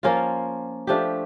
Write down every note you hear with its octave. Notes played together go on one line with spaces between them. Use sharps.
F3 A#3 C#4 F4
F3 A3 D4 G4